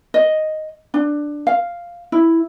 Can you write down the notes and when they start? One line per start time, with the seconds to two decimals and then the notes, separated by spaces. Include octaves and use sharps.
0.14 D#5
0.94 D4
1.47 F5
2.12 E4